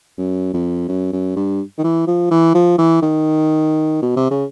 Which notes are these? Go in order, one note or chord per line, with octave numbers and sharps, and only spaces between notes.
F#2
F2
F#2
F#2
G2
D#3
E3
F3
E3
F3
E3
D#3
B2
C3
C#3